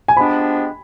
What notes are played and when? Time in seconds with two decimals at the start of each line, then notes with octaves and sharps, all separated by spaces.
0.08 G#5
0.17 F3 G#3 B3 D4 G4 B5